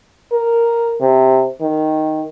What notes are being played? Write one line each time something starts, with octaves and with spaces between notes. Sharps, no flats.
A#4
C3
D#3